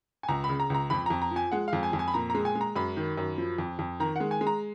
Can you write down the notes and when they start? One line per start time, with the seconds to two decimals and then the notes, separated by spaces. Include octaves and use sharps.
0.23 G#5
0.28 C#2 A#5
0.44 B5
0.49 C#3
0.60 A#5
0.70 C#2 A#5
0.90 F2 B5
1.06 F2 A#5
1.22 A#5
1.31 F3 G#5
1.52 G#3 F#5
1.68 F5
1.73 F2
1.83 G#5
1.93 F2
1.99 G#5
2.08 B5
2.14 A#2 A#5
2.30 G#3 A#5
2.45 G#5
2.55 G#3
2.61 A#5
2.76 F#2 B5
2.97 D#3
3.17 F#2
3.38 F3
3.58 F2
3.79 F2
4.00 D#3 A#5
4.16 G#3 F#5
4.31 G#5
4.41 G#3
4.47 A#5